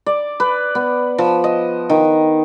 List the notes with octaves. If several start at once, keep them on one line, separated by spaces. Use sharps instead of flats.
D5
B4
B3
F3
D#5
D#3